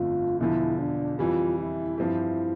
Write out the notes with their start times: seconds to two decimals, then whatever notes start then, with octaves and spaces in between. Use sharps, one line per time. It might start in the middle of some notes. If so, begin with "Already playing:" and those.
Already playing: G1 F2 D3 A3 F4
0.40 E1 E2 D3 F3 E4
0.79 D4
1.19 F2 E3 G3 F4
1.58 E4
1.98 G2 F3 C4 E4 G4